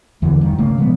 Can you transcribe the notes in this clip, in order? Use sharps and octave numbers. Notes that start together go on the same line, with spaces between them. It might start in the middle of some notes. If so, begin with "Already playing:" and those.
E2 D3 E3
G2 D#3
C#3 A3 A#3
C3 F3 G#3 B3